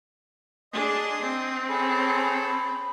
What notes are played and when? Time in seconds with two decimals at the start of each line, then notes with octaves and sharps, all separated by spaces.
0.73 D4 G#4 D#5 C6 D#6
1.22 C4
1.69 C#4 G#4 A4 B5